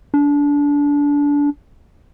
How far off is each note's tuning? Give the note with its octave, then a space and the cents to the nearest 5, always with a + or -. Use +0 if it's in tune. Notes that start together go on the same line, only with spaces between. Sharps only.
D4 -25